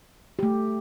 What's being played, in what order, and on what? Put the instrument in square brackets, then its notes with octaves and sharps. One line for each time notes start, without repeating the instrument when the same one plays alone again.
[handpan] A3 G4